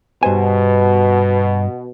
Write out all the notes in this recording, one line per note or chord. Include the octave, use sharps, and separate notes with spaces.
G2 B2 C5 G#5